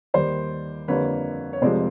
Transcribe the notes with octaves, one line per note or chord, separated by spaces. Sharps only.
D#2 D#3 G3 C5 D5
F2 D3 G3 A#3 B4 C#5
C#5
F1 F2 C3 F3 G#3 C5 D5